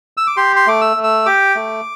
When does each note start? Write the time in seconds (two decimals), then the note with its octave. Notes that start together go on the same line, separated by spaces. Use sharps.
0.17 E6
0.27 D6
0.37 G4 C6
0.56 C6
0.67 A3 D6
0.81 E6
0.97 A3
1.04 E6
1.26 G4 D6
1.55 A3